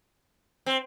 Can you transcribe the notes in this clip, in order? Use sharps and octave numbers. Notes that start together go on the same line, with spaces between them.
C4